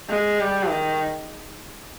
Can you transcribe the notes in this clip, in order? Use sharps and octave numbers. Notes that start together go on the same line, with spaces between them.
G#3
G3
D#3